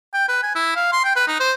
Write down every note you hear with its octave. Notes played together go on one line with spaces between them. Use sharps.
G5
B4
G#5
E4
F5
C6
G5
B4
D#4
C5